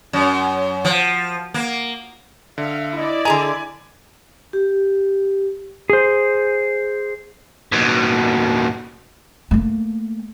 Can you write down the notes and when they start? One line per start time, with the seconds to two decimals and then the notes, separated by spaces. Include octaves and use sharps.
0.13 F#2
0.85 F3
1.54 A#3
2.58 D3 E5 F5
2.96 E4 D5 D#5
3.25 D3 G#4 G#5 A#5
4.53 G4
5.90 G#4 C5
7.72 D#2 B2
9.51 A3 A#3